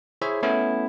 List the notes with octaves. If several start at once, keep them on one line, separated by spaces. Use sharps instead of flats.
E4 G#4 C5 C#5 E5
A3 B3 C#4 E4